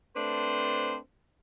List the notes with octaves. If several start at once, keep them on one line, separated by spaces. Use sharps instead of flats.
A3 C4 D4 B4 C5